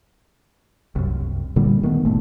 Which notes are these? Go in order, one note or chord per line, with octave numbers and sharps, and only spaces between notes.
C2 F#2
A#2 D3 G3
D#3 A3 B3
F#1 A#2 A3